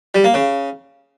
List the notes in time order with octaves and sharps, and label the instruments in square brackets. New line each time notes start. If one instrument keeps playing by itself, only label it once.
[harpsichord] G3
A#3
C#3